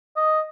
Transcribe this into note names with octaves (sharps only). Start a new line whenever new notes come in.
D#5